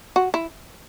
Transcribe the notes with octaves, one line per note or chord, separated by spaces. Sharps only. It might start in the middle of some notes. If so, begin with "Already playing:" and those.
F#4
E4